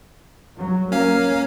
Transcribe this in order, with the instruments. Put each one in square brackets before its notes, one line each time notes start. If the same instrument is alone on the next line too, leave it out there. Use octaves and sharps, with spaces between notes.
[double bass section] F#3
[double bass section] A#3 [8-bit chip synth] C#4 F5